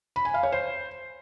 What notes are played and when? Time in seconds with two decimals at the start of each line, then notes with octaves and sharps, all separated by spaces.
0.16 B5
0.25 G#5
0.34 F5
0.43 C#5
0.52 C5